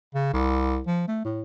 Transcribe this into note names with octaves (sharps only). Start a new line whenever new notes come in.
C#3
C2
F3
A3
A2